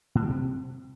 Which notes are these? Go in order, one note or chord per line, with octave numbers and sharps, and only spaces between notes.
A2
G3
C3